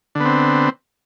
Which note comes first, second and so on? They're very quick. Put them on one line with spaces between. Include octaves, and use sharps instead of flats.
D3 B3 C4